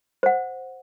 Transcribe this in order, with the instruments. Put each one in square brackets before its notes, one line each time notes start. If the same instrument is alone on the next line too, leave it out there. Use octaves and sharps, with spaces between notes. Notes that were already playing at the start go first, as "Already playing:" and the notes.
[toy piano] C5 F#5